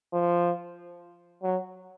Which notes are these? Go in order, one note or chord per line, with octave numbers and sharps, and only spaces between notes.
F3
F#3